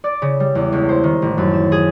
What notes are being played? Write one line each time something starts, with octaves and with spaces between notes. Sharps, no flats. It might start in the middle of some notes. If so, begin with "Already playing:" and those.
D5
C#3
G3
E2
C#2
C5
D#3
A1
F#2
E7
G#4